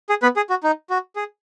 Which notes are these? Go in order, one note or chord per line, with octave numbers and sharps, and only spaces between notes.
G#4
B3 B4
G#4
F#4
D#4
F#4
G#4